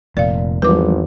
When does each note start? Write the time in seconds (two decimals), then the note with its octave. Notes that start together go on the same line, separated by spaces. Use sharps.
0.17 F1 A#2 D5 F5
0.62 G#1 E2 F3 G3 G#3 B4 D6